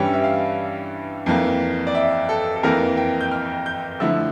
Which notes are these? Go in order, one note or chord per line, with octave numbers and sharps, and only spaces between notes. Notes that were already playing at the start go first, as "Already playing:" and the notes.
Already playing: G2 E3 G3 C#4 E4 G5
E5
F5
F2 E3 A#3
D5
E5
A4
A4
F2 E3 A#3 A#4
G5
G6
F6
G6
D3 F3 A3 E4 E6